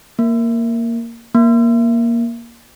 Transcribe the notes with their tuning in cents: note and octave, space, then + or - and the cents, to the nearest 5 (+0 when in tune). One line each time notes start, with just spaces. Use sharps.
A#3 -5
A#3 +10